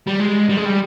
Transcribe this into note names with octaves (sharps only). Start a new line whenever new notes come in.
G3
G#3
G3
G#3
G3